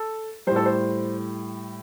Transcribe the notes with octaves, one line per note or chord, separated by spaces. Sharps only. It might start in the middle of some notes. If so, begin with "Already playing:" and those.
Already playing: A4
A2 G3 C5
A4
C5